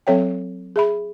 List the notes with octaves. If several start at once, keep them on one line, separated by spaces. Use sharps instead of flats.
F#3 C4 A4 C#5 E5 G5
G#4 E5 B5